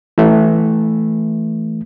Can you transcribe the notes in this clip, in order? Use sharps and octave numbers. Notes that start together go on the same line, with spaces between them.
E3 A3